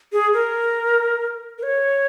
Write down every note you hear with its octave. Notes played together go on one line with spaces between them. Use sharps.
G#4
A#4
A#4
C#5